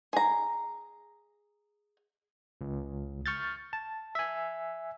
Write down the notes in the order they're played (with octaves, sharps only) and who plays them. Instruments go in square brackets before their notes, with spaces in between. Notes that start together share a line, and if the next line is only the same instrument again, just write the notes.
[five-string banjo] G#4 A#5
[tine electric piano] C#2
C#6 F6 G6 A6
A5
E5 G#5